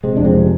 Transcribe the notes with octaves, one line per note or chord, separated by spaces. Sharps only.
C3 G#3 C4
F2 D4
G#3 C4
C3